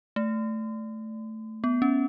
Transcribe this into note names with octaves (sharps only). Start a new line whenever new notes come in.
A3
B3
C#4